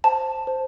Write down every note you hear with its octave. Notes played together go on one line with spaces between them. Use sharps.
C5 A5
C5